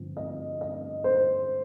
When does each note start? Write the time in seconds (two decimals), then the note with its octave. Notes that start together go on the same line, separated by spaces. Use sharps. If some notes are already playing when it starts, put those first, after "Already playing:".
Already playing: G2 D3 F3 C4
0.17 D#5
0.61 D#5
1.04 C5